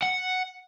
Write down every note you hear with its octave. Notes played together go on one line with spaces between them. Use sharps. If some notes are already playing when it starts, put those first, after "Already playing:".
F#5